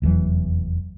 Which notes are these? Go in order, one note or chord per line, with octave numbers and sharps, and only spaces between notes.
F1 E2 E3 F#3